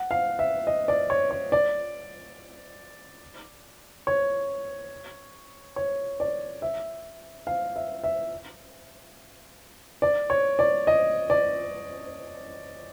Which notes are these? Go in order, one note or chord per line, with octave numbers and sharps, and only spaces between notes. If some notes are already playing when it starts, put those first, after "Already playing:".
Already playing: F#5
F5
E5
D#5
D5
C#5
C#5
D5
C#5
C#5
D5
E5
F5
E5
E5
D5
C#5
D5
D#5
D5